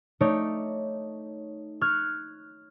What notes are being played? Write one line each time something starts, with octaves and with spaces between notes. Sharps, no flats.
A3 D#4 C#5 D5
C#6 F6 F#6 G#6